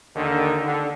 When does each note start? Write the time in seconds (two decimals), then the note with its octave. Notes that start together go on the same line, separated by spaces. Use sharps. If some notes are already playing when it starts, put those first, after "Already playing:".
0.16 D#2 D3 D#3
0.65 D3